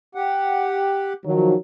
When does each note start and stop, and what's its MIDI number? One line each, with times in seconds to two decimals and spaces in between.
0.15 1.13 67
0.15 1.13 78
1.25 1.55 51
1.25 1.55 53
1.25 1.55 54